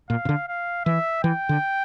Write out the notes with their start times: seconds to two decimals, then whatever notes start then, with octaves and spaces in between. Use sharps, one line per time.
0.10 A#2 F5
0.25 C3
0.29 D3
0.48 F5
0.85 E3 E5
1.24 E3 G5
1.49 D3